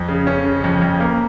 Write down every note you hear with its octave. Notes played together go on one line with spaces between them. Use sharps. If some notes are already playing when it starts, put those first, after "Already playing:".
Already playing: F2
C#3
C#4
C#3
F2
F2
A#3